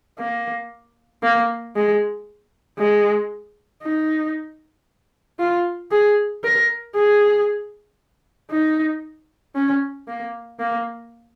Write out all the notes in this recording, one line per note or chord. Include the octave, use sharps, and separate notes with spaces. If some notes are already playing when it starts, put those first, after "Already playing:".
A#3
A#3
G#3
G#3
D#4
F4
G#4
A#4
G#4
D#4
C#4
A#3
A#3